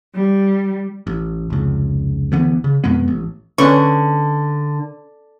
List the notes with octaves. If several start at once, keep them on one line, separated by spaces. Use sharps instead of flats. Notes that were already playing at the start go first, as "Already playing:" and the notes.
G3
A1
F1 C#2
D2 E3 B3
C#3
F2 B2 G#3 B3
A1
D3 C#4 B4 C#6